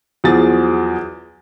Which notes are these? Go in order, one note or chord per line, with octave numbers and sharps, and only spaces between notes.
E2 F3 F#3 G#4 A6